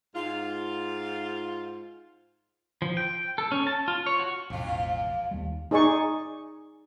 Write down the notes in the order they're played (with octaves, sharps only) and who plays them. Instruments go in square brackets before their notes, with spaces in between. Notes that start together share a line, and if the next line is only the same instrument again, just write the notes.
[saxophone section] G#2 F4
[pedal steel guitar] F3
G5
A4
C#4
A5
F4
C#5
F#4
[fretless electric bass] E1 A1 [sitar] F2 F4
[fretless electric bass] D#2 G3
[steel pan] D#4 G#4 D5 G#5 C#6